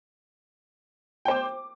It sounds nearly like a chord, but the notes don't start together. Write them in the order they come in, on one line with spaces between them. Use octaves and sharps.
G5 C5 D6